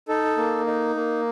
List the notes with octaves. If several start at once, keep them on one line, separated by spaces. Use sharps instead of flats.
D#4 A4
A#3
D#4
A#3